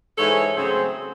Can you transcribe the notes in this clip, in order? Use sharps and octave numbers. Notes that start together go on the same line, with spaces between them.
G#2 E3 G#3 A4 C#5
C#3 F#3 A3 C4 G#4 C5